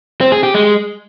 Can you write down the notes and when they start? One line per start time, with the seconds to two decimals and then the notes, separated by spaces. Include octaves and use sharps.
0.21 C4
0.32 G#4
0.43 G4
0.54 G#3